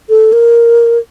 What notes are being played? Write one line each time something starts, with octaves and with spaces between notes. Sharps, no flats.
A4
A#4